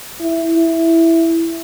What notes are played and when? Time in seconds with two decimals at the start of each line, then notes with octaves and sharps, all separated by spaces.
0.20 E4
0.56 E4